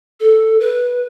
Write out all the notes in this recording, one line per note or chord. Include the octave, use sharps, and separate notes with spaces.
A4
B4